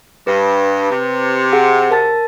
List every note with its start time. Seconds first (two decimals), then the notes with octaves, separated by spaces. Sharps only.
0.27 G2 B4
0.91 C3
1.53 G#4 F#5
1.91 A#4 A5 A6